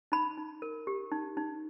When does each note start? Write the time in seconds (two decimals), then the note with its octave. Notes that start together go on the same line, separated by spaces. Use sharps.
0.12 D#4 B5
0.38 D#4
0.62 A#4
0.87 G4
1.12 D#4
1.37 D#4